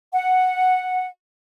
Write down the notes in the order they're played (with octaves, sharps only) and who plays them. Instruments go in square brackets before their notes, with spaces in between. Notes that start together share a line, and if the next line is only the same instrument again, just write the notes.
[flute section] F#5